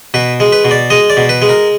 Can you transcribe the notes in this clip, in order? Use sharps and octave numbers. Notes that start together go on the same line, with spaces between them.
B2 B4
G#3
B4
B2
D5
G#3 D#5
D5
B2
B4
G#3
A#4